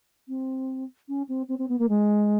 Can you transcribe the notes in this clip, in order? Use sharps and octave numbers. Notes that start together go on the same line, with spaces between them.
C4
C#4
C4
C4
C4
B3
A#3
G#3